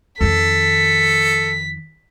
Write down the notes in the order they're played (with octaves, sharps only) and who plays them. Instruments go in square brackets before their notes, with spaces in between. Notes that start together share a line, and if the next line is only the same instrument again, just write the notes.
[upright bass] F2 D#3 [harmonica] A4 [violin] B6